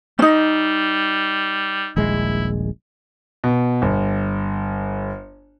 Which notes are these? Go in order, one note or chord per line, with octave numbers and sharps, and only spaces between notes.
G3 C#4 D#4
D#1 A#1 G#3 E4
B2
G1